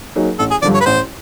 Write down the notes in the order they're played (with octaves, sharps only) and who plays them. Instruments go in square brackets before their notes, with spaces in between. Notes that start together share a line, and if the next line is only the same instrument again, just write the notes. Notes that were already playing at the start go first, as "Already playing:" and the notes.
[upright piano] F#3 A#3 D#4 G#4
[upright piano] A1 [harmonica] A4
[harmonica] G#4
[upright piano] G2 D3 F3 [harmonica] D5
[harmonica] C#5
B4
[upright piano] A1 [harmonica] C5